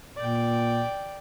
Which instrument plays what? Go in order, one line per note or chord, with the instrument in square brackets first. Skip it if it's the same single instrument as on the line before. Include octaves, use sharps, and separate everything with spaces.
[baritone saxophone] A#2 [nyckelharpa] D5 G5